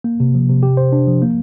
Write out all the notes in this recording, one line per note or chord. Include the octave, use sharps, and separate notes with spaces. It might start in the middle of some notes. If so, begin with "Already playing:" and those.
A#3
C3
F3
C3
G4
C5
D4
F3
A#3